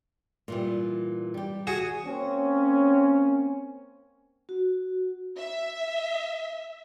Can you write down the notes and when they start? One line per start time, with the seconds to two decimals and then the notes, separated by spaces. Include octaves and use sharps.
0.48 A#2 E3 G3
1.34 G3 G4
1.67 F#4 G#4
2.06 A#3 C4 C#4
4.49 F#4
5.38 E5